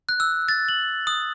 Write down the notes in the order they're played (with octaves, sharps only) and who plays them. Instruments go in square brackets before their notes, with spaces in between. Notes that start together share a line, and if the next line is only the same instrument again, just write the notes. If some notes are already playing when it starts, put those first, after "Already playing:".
[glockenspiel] F#6
E6
A6
F#7
D#6